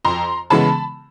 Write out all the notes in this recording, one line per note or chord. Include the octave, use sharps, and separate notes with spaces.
F2 A#5 C6
C#3 E3 G#3 B3 A5 B5